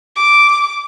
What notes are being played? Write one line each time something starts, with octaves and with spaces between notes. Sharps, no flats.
D6